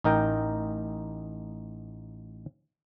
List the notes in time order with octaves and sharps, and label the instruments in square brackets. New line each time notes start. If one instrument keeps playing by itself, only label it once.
[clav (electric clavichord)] A1 D#4 A#4 G5